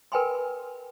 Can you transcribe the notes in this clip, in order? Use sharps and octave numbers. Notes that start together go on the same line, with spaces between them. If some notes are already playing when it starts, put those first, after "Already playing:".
A#4 B4 G5 G#5 B5 C6